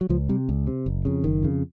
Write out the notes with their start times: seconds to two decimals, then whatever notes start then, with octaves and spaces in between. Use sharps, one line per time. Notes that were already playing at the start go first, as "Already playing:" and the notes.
0.01 F#3
0.09 C#2 F3
0.29 C3 G3
0.49 C#2
0.67 C3
0.86 F#1
1.05 F2 C#3
1.24 F#1 D#3
1.43 F2 C#3